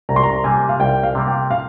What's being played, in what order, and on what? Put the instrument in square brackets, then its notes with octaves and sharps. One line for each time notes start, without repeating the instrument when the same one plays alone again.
[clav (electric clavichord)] C2 [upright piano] A#5
[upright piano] C6
A#5
[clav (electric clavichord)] C3 G3 A#3 [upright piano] G#5
[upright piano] F5
[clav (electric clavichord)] C2 [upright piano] G5
[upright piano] F5
[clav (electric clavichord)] C3 G3 A#3
[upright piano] G5
F5